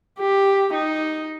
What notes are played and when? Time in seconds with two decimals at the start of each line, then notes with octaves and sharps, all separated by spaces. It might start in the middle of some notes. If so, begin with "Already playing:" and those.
0.19 G4
0.74 D#4